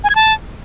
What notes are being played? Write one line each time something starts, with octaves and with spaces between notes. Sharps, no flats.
G#5
G#6
A5